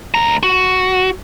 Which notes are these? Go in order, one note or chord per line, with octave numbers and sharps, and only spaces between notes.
D2 A#5
F#4